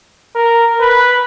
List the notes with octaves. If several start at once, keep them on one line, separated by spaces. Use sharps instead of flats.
A#4
B4